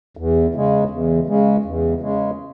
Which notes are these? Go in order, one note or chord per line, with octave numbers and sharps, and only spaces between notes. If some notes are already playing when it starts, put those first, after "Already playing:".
E2
C#3 G#3
E2
C#3 G#3
E2
C#3 G#3